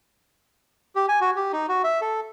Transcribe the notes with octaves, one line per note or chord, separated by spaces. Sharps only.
G4
G#5
F#4
G4
D#4
F#4
E5
A4